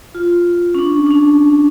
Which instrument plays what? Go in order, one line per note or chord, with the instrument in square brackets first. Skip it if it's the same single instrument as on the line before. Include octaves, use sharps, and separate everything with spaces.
[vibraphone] F4
C#4
D4
D4
C#4